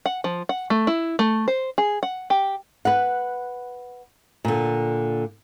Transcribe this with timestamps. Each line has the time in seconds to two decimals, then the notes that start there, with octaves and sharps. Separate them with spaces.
0.06 F#5
0.24 F3
0.49 F#5
0.70 A3
0.87 E4
1.19 A3
1.48 C5
1.78 G#4
2.03 F#5
2.30 G4
2.85 B4 F#5
4.45 A#2 D3